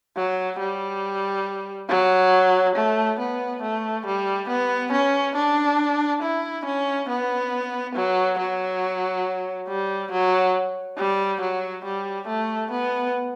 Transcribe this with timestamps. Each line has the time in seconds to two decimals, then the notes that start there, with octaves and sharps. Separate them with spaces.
0.17 F#3
0.60 G3
1.89 F#3
2.76 A3
3.20 B3
3.63 A3
4.06 G3
4.49 B3
4.93 C#4
5.36 D4
6.23 E4
6.65 C#4
7.09 B3
7.95 F#3
8.39 F#3
9.69 G3
10.12 F#3
10.98 G3
11.41 F#3
11.85 G3
12.28 A3
12.71 B3